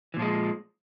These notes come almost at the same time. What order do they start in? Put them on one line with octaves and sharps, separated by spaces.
E3 A#2 F3 G#3